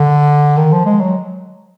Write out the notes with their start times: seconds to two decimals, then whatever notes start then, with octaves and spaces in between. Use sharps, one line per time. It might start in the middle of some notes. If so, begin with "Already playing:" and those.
Already playing: D3
0.57 D#3
0.72 F3
0.86 G#3
1.01 F#3